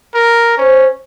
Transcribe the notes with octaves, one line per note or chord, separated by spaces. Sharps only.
A#4
C#4 C5